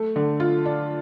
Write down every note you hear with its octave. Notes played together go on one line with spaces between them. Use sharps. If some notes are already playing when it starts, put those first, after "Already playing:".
Already playing: A3
D3
F4
D4